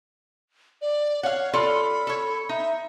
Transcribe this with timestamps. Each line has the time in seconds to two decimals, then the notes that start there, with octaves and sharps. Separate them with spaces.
0.82 D5
1.23 C#5 F5 F#5
1.53 F4 A4 D5 B5
2.07 A4 C#5
2.49 D#4 E5